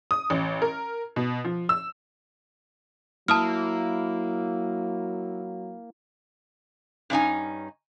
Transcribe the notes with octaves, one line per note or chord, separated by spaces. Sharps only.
D#6
A1
A#4
B2
F3
E6
F#3 A#3 E4 A5 D#6 F6
G2 C#4 D#4 G#5